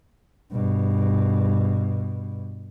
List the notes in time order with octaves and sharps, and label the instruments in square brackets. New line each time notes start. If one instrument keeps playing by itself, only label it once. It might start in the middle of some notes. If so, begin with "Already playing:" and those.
[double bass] G2 B2